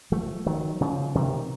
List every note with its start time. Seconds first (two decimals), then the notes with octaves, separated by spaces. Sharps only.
0.12 F3 A3
0.46 D#3 F#3
0.81 C#3 F3
1.15 C3 D#3